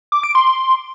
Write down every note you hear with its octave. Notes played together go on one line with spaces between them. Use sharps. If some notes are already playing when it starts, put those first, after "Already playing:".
D6
D7
C6